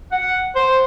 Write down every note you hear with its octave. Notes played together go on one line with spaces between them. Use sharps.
F#5
C5